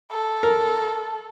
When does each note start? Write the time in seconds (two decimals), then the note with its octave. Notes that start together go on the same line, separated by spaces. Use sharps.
0.11 A4
0.43 A#4